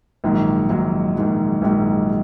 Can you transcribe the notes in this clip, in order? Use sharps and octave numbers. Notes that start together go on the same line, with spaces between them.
A#1 G#2 D#3 F#3
A#1 G#2 D#3 F#3
A#1 G#2 D#3 F#3
A#1 G#2 D#3 F#3